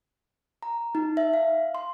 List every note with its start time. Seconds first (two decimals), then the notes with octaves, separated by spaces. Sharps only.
0.63 A#5
0.95 D#4
1.17 E5
1.33 F5
1.75 C6